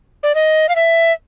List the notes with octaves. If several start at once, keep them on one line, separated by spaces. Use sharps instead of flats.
D5
D#5
F5
E5